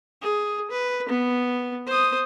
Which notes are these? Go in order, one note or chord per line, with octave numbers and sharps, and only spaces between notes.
G#4
B4
B3
C5 D#6